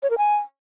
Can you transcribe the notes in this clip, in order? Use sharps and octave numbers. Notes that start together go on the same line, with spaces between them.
C#5
A#4
G#5